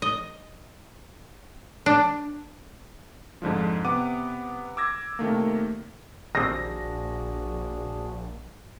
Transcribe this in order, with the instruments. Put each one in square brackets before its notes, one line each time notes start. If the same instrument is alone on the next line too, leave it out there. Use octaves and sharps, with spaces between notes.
[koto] D#5
D4
[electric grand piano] F2 G#2 D3 F3
C3 B3 F#5 D6 D#7
D6 E6 G#6 A#6
C3 D#3 A3 A#3
[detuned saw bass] A#1 [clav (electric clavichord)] D#3 G3 C4 [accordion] D4 F#4 G#4 [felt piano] A#6